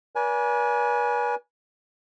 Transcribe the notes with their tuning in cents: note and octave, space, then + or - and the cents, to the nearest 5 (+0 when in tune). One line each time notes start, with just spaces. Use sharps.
B4 -40 D5 -35 G#5 +10